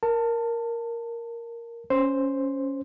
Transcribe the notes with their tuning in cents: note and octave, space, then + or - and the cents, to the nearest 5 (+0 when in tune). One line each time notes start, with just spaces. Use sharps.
A#4 +0 A5 +20
C#4 +0 C5 +0